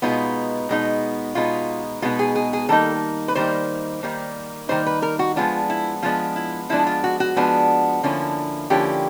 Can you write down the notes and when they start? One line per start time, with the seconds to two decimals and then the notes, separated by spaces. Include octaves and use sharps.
0.02 B2 G#3 B3 D#4 F4
0.69 B2 G#3 B3 D#4
1.35 B2 G#3 B3 D#4 F4
2.02 B2 G#3 B3 D#4 F4
2.19 G#4
2.36 G#4
2.53 G#4
2.69 D#3 G3 A#3 D#4 A4
3.28 B4
3.35 D#3 G3 A#3 D#4 C5
4.03 D#3 G3 A#3 D#4
4.69 D#3 G3 A#3 D#4 C5
4.86 B4
5.02 A#4
5.19 F#4
5.36 F3 G#3 B3 D4 F4
5.70 E4
6.02 F3 G#3 B3 D4 F4
6.36 E4
6.69 F3 G#3 B3 D4 E4
6.87 F4
7.04 F#4
7.20 F#4
7.36 F3 G#3 B3 D4
8.03 D3 F3 A#3 C#4 E4
8.70 D3 F3 A#3 C#4 E4 G4